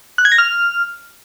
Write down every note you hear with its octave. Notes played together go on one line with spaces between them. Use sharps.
F#6
G#6
A#6
F6